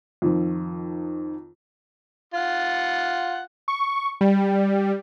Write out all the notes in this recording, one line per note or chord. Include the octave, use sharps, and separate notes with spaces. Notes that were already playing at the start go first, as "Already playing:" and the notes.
F2 D#3 F3
F4 F#5
C#6
G3